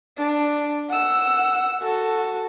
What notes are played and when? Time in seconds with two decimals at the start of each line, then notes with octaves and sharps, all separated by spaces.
0.18 D4
0.90 F#5 E6
1.82 F#4 A4